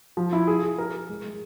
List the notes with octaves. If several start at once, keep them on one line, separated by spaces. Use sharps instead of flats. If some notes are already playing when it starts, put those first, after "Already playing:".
F3
E4
G#4
G#4
A#4
A#4
G#3
G#3